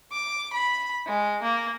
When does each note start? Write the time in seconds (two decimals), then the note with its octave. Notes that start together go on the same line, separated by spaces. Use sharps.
0.12 D6
0.53 B5
1.06 G#3
1.43 A#3